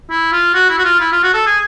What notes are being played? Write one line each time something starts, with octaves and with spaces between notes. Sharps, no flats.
E4
F4
F#4
E4
F#4
F4
E4
F4
F#4
A4
G#4